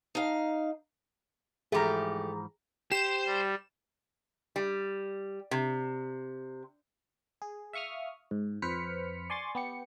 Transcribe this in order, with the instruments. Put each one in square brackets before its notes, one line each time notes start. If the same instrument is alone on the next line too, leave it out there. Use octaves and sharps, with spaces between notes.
[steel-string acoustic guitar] D#4 F5
[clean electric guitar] G#2 E3 F3 [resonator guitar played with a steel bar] A3 G4 [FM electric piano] G#4 A#5
[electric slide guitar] G4 [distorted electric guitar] C5 [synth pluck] E7
[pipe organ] G3
[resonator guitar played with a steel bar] G3
C3
[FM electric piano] G#4
E5 F5 C#6 D#6 F6
G#2
F2 B4 C5 F6 B6 C#7
D5 G#5 C6 C#6 A6
B3 G4 C#7